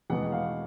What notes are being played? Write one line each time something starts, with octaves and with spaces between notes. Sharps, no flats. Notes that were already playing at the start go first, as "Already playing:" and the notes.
E2 B2 G#3 B3 F#5
F5